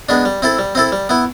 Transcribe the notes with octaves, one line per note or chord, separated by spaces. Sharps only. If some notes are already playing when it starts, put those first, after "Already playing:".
G#3 B3 D4
G3
C4 E4 A4
G3
C4 E4 A4
G3
B3 E4